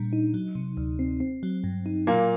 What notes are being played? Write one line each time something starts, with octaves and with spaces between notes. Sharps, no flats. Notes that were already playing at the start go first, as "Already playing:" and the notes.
Already playing: A#2 G3 D4
D#4
F#3
C3
D2
C4
C4
F#3
G2
D#4
A#2 F#3 A#3